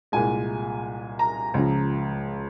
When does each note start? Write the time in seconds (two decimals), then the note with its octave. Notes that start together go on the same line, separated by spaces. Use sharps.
0.12 C2 A#2 G#3 G#5
1.19 A#5
1.54 C#2 C#3 F3